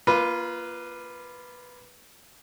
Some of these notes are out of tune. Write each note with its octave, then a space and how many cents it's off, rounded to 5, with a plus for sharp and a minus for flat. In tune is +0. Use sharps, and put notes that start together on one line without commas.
A#3 +25 F4 -15 B4 +0